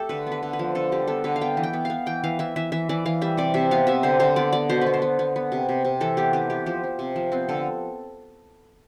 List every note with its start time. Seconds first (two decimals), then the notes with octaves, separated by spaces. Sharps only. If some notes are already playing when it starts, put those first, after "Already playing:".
Already playing: A3 G4 A4
0.09 D3 B4
0.26 B3
0.32 B4
0.43 D3
0.53 B4
0.59 F3
0.75 D3 A4
0.92 G3 G4
1.07 B3 A4
1.24 D3 B4
1.36 F5
1.41 B3 G5
1.57 E3
1.63 G5
1.73 B3
1.85 B3 F5
2.06 E3 G5
2.24 E3 F5
2.39 E3 E5
2.56 E3 E5
2.72 E3 E5
2.89 E3 D5
3.06 E3 F5
3.22 G3 E5
3.37 C3 D5
3.54 C3 E5
3.71 B3 F5
3.87 C3 E5
4.03 D3 C5
4.20 D3 C5
4.36 B3 D5
4.53 B3 D5
4.69 B2 C5
4.81 B4
4.86 B3
4.94 C5
5.02 B3
5.19 B3
5.36 B3
5.52 C3
5.69 C3
5.85 C3
6.01 E3 A4
6.17 B3 G4
6.33 E3 G4
6.50 B3 G4
6.66 F3 G4
6.84 F3
6.99 C3
7.16 F3
7.32 B3 C4
7.49 D3 A4